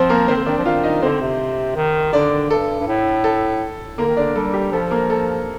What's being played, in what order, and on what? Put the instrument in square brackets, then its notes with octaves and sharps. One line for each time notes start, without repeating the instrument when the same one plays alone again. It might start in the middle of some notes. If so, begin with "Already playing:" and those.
Already playing: [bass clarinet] F3 [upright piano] C4 C5
[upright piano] A#3 A#4
[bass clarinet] D#3 [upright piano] C4 C5
[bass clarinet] D3
[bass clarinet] D#3 [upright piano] D4 D5
[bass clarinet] F3
[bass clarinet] D#3 [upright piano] F4 F5
[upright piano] D#4 D#5
[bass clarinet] D3 [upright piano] C4 C5
[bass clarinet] C3
D#3
[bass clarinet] D3 [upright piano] D4 D5
[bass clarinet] G2 [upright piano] A4
[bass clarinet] G2
A2
[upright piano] A4
[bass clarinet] D3 [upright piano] A#3 A#4
[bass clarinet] D#3
[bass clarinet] D3 [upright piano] D4 D5
[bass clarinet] G3 [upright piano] A4
[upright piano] G4
[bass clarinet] F3 [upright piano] A4
[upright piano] A#3 A#4
A4